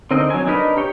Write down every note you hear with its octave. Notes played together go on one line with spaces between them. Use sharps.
D3 C4 D#4 A#4 D#5
F#3 G#5
D4 D#4 A#4 B4 D#5
G4 C#5 G5